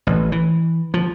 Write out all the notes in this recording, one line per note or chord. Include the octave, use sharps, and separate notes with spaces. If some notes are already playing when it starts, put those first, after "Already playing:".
A1
E3
F3